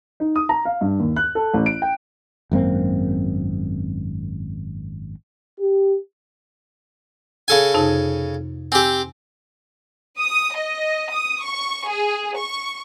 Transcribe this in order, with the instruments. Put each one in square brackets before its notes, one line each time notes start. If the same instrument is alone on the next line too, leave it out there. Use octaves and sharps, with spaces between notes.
[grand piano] D#4
D#6
A#5
F5
G2
D#2
F#6
A4
A1
D7
G5
[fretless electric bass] G#1 F#2 A#3 C4
[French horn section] G4
[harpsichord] C#3 A4 G#5
[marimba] F2 C3 D#4
[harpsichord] C4 G4 [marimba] G#5 D6 E6
[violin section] D#6
D#5
D#6
C#6
G#4
C#6